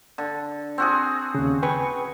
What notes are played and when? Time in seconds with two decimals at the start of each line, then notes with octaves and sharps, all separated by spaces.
0.18 D3
0.78 C4 F#4 G#4
1.35 D#2 C#3
1.63 B4 G5 G#5 C#6